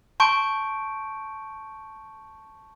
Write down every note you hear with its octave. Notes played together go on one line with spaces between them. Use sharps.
A5 C6 C#6 G6 D7